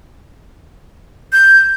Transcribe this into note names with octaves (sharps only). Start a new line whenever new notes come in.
G6